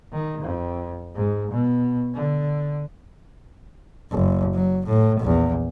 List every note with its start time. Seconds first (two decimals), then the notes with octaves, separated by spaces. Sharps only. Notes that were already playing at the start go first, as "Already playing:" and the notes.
0.12 D#3
0.41 F2
1.15 G#2
1.51 B2
2.14 D3
4.11 F#1
4.54 F#3
4.86 A2
5.20 A#1 E2